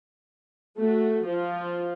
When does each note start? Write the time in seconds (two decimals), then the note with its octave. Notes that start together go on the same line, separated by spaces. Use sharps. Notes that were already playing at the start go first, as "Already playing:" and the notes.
0.78 A3 F#4
1.26 F3 F4